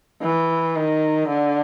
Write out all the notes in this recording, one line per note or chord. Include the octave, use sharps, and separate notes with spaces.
E3
D#3
D3